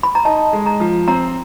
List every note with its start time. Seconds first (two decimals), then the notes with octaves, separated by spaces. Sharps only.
0.03 B5
0.15 A#5
0.25 D#4 A5
0.53 G#3
0.66 A#5
0.80 F3
1.08 C4 A#5